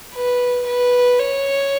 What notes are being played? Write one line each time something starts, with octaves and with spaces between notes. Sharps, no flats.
B4
B4
C#5